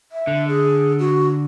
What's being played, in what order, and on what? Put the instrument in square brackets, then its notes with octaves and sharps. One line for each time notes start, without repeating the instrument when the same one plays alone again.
[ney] E5
[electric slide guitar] D3
[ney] G#4
F#4